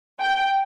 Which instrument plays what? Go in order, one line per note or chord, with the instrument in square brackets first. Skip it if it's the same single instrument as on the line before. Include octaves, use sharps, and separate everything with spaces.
[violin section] G5